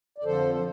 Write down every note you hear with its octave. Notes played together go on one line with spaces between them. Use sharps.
D5
F2 D3 F3 A4 C5
C5